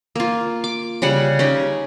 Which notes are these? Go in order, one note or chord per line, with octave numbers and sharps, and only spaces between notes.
A#3 F4
D6
C#3 G3 F#5
C#4 D#4 G4